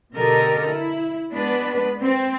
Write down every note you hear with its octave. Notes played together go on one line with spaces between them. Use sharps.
B2 D3 G4 A4 A#4 D#5
E4
G#3 B3 D4 B4
C4